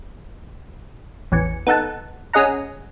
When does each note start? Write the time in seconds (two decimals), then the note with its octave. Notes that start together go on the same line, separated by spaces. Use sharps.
1.32 A1 E2 G#5 C#7
1.67 B3 D#4 A4 F#5 A5
2.33 C#4 G#4 D#5 F#5 A#5